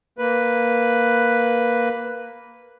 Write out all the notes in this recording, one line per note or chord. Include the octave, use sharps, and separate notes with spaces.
A#3 B4